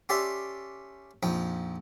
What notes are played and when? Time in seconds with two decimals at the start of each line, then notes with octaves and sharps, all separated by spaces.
0.09 C#4 G4 A4 D5 E5 C6
1.23 A#1 F2 D#4 G5